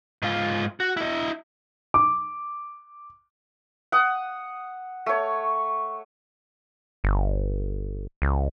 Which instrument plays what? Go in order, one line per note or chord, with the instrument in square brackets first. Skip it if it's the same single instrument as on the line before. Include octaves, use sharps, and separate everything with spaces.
[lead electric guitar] G#2 F4
F#4
E4 D#5
[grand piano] D6
[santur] F#5 D#6
A3 C#5
[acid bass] G1
C#2